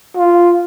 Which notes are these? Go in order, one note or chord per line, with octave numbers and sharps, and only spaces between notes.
F4